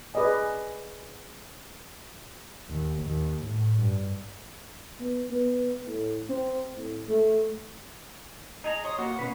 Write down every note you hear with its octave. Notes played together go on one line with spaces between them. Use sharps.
G#4 B4 D5 D#5 G#5
D#2
D#2
A2
G2
B3
B3
A2
C4
A2
A3
D#4 G#4 D#5 A#5
C#5 C6 D#6
A#3 F#4 F#5 A#5
B2 A#3 C#4 B4